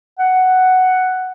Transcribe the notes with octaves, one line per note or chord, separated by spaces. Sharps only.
F#5